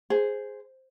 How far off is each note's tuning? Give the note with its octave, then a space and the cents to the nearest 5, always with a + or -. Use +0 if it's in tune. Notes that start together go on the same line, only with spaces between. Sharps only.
G#4 +0 C5 +0